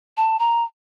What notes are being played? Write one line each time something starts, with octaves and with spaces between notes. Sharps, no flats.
A5
A#5